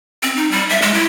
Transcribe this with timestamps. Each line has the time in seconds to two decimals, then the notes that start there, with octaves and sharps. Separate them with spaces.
0.23 C4
0.36 D#4
0.51 G3
0.69 E5
0.82 G#3
0.94 E4